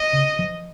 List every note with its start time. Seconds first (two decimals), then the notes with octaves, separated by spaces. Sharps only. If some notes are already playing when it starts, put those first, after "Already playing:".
Already playing: D#5
0.13 C#3
0.39 F3